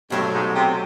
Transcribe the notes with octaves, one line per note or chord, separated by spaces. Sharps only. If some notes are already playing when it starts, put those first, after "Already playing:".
G2 B2 F#3 A3
G#2
C3